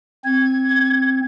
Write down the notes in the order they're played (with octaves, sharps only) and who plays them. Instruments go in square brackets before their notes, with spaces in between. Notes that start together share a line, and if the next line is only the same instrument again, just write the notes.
[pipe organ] C4 [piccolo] G#6